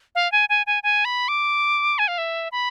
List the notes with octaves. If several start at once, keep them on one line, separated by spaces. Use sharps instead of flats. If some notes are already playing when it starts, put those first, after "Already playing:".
F5
G#5
G#5
G#5
G#5
B5
D6
G#5
F5
E5
B5